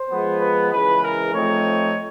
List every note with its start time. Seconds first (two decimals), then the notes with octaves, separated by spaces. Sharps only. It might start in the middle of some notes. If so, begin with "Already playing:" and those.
Already playing: C5
0.10 F3 G#3 B3
0.41 B4
0.72 C#3 E3 G#3 B4
1.03 A#4
1.34 F3 A3 C4 D#4 C#5